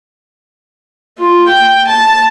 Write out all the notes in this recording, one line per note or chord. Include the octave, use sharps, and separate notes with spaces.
F4
G5
A5